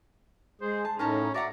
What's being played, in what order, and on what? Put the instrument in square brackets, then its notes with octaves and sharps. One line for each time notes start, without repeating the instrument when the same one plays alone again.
[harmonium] G#3 G#4 [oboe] C5
[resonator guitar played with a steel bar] A5
[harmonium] A2 D#4 [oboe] C#4 [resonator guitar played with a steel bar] A#4 A5 A#5
[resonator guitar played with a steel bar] F#4 E5 F#5 [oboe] D5 [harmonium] A#5